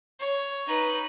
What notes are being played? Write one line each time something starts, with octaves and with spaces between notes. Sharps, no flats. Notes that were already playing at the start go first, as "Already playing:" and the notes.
C#5
D#4 B4